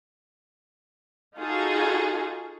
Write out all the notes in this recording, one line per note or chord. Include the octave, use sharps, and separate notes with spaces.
D#4 F4 F#4 G#4 A4